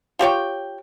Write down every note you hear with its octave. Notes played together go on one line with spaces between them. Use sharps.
F4 G4 C#5 G5